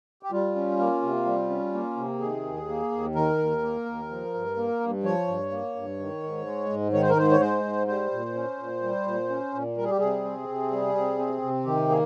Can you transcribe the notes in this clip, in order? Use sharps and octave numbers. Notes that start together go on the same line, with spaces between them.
G4
G3 F4
C#4
A#3
C3
G3
C#4
A#3
C3
D#3 G#4
D#2
A#3
D#2
D#3 A#4
D#2
A#3
D#2
F3
G2
A#3
G2
F3 C#5
G2
A#3
G2
D#3
G#2
G#3
G#2
D#3 C#5
C5
A#4
G#2 C5
C#5
G#3 C5
G#2
G3 C5
A#2
C#4
A#2
G3
A#2
C#4
A#2
G3 A#4
G#4
G4
C3 G#4
C4
C3
G3
C3
C4
C3
D#3 G4
A#3 G#4